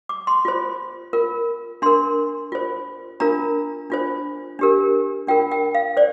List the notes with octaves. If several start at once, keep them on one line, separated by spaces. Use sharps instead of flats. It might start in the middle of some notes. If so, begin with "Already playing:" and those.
D6
C6
F4 C5
F4 A#4
D4 A#4 C6
F4 C5
D4 F4 A#4 A#5
D4 F4 C5
D4 G4 A#4
D4 F4 A#4 G5
G5
F5
C5 D5